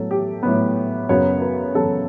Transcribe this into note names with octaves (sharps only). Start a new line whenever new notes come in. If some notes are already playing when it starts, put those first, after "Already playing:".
Already playing: A2 F#3 B3 A4
G4
A2 F#3 B3
F#2 C#3 F#3 B3 C#5
B4
F#2 C#3 F#3 B3 A4